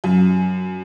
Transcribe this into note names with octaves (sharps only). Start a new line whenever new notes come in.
F#2